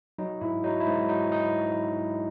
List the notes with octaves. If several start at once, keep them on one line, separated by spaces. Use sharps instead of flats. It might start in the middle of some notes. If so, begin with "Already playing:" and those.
F#3 D#4
G#2 E4
F#3 D#4
E4
G#2 D#4
F#3 D#4
D#4